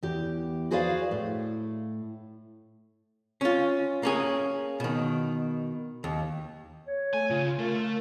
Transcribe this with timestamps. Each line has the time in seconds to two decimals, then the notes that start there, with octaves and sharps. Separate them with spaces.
0.03 E2 G4
0.71 F#4 G#4 B4 C5 D5 F5
1.11 A2
3.41 C#4 F4
4.03 A#3 C#4 G#4
4.80 B2 D#3
6.04 D#2
6.88 C#5
7.14 A3 G#5
7.30 C#3 F4
7.59 A3 A#4